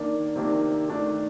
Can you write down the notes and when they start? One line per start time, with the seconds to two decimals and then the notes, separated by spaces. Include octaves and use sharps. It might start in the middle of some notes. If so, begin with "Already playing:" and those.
Already playing: D#3 A#3 D4
0.36 C3 D#3 A#3 D4
0.88 D#3 A3 D4